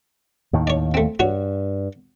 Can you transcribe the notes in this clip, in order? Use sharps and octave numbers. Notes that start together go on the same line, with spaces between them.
D#2 A2 D#3
C#5 D5
A3 C4
G2 F#4 C#5